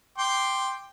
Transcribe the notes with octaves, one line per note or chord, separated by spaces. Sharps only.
G5 C6 D6